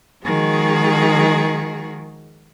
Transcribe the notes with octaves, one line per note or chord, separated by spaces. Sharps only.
D#3 F3 G#3 F#4 G#4